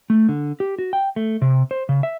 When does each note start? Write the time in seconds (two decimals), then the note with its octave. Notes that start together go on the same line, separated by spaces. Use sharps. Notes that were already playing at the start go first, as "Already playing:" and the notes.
0.10 A3
0.29 D3
0.60 G4
0.79 F#4
0.93 G5
1.16 A3
1.42 C3
1.71 C5
1.89 C#3
2.03 E5